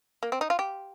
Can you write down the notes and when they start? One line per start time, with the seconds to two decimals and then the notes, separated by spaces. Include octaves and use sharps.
0.23 A#3
0.32 C4
0.41 D#4
0.50 F4
0.59 G4